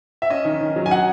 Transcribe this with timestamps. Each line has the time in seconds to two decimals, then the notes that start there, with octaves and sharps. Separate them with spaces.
0.22 E5
0.30 C#4 D#5
0.45 D#3
0.61 D#3
0.76 F#3
0.86 G#5
0.91 D#4 F#5